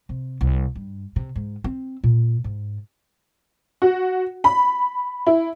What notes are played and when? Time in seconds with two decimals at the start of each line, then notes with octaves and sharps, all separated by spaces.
0.09 C3
0.41 C2
0.75 G2
1.16 C3
1.36 G#2
1.64 C4
2.04 A#2
2.44 G#2
3.82 F#4
4.44 B5
5.27 E4